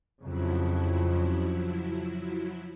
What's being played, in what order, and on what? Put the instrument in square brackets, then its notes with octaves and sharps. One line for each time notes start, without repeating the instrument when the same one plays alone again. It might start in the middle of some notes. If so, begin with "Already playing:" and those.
[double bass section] F2 C#3 [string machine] F3 F#3 E4